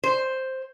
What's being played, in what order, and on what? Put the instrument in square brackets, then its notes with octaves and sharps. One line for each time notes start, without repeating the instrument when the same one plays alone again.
[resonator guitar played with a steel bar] C5